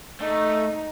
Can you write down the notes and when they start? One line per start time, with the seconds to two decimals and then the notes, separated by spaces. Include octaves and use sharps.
0.21 A3 D#4